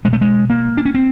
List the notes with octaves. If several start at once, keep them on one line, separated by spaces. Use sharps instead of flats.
B2 G#3
A3
G#3
A#3
D4
C#4
C4